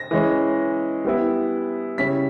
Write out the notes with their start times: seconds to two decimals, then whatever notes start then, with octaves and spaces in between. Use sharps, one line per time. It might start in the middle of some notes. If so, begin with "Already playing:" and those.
Already playing: A#6
0.11 E3 G#3 C#4
1.05 G3 B3 E4
1.98 C#3 G3 C#4 E4 B6